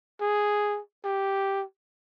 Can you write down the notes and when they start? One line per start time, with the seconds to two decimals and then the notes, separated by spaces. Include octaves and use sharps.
0.21 G#4
1.05 G4